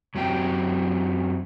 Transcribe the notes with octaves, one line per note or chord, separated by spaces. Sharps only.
F#2 F#3 C4 G4 G5